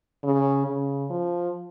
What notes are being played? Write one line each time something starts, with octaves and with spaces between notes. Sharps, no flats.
C#3
C#3
F3